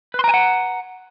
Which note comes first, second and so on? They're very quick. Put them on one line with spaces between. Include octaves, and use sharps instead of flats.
B4 C6 A#5 G#5 F#5